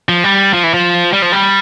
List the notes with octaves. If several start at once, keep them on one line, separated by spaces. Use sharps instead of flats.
F3
G3
F3
E3
F3
G3
F3
G3